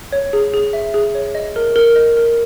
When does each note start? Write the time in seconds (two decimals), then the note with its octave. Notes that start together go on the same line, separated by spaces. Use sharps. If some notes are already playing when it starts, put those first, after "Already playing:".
0.12 C#5
0.33 G#4
0.54 G#4
0.73 E5
0.94 G#4
1.15 C#5
1.35 D#5
1.56 A#4
1.76 A#4
1.96 D#5
2.17 A#4